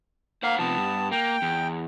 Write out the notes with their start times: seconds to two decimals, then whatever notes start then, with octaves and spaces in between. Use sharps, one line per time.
0.43 A#3 C5 F5 F#5
0.59 C3 F3 B3 A5
0.77 G2
1.12 A#3 G5
1.42 E2